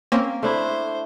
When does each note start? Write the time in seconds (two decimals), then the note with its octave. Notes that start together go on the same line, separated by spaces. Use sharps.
0.12 A#3 C4 C#4
0.43 A3 D4 E4 C5